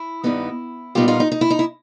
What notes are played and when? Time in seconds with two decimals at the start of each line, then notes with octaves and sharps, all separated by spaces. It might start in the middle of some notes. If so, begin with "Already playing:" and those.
Already playing: E4
0.23 G2 D#3 G3 B3 D#4
0.95 A#2 G3 B3 D#4 F4 G4
1.08 D#4 F4
1.20 D#4
1.32 D#4
1.41 E4
1.50 D#4
1.59 E4